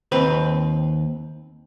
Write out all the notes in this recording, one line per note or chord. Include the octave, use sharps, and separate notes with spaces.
D#2 C4 B4